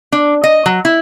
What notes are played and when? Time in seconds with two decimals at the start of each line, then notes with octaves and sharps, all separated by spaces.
0.12 D4
0.44 D#5
0.66 F#3
0.85 E4